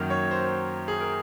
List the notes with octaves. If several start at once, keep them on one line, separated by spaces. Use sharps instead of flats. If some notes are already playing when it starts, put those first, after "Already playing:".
Already playing: F#2 D#3 F#3 A#3
C#5
C5
G#4
A#4